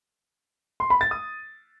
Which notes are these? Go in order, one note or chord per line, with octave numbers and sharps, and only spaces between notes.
C6
B5
A6
D#6